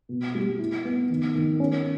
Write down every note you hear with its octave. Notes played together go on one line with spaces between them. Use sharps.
B2
G3
E4
B3
D#3
D#3
C#4